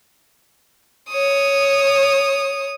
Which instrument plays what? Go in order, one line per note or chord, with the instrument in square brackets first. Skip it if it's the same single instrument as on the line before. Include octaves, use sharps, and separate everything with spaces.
[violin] C#5 D#6